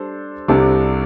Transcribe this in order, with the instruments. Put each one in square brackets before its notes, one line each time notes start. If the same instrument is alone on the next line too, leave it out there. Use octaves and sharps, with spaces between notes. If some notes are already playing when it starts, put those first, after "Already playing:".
Already playing: [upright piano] G3 D4 A4 C5
[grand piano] C2 C3 [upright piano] G3 D4 A4 C5